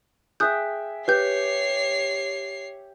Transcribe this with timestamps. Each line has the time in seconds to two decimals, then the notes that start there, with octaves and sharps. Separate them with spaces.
0.40 G#4 E5 G5 D#6 F#6 G6
1.08 G4 B4 C#5 G6 C7